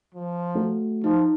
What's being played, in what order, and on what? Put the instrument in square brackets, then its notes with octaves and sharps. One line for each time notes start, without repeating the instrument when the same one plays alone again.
[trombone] F3
[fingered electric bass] F#3 A3
[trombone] F3 [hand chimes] D#4